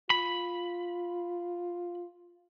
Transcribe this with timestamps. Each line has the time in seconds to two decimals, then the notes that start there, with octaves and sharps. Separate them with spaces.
0.10 F4 B5